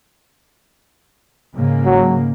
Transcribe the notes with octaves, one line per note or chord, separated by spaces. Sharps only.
G#2 C#3 A#3
F#3